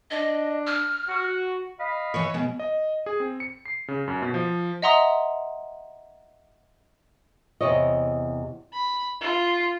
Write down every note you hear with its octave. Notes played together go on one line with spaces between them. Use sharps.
D4 D#5
F6
F#4
D#5 F5 B5
E3 B4 C#5
B2 G#3
D#5
G#4
C4
C#7
C7
C#3
F#2
B2
F3
D#5 E5 F#5 A#5 C6 D#6
E2 C3 E4 C#5 D#5
B5
F4